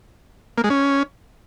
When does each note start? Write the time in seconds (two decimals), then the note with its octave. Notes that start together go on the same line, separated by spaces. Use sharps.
0.58 A#3
0.64 G#3
0.70 C#4